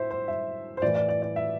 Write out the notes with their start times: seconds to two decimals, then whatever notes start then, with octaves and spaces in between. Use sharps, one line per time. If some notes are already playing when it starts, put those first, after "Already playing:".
Already playing: A2 C5 E5
0.11 C5
0.28 E5
0.77 C5
0.82 A2 E3 D5
0.95 D5
1.09 D5
1.22 D5
1.36 E5